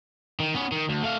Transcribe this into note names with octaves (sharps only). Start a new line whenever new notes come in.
D#3
B3 C#4
D#3
D2
A3 F5